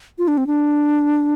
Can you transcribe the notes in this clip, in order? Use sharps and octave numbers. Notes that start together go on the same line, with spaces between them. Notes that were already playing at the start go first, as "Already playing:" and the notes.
F4
D4
C4
D4